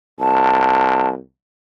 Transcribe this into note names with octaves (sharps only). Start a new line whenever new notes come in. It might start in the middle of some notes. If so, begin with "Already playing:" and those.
C2 A5